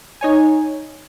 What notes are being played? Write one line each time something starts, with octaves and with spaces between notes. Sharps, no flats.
D#4 C#5 G#5